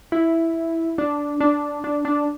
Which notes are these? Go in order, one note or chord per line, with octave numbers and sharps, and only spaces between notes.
E4
D4
D4
D4
D4